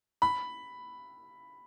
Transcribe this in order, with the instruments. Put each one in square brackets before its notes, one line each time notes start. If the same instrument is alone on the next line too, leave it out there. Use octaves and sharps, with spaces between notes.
[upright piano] B5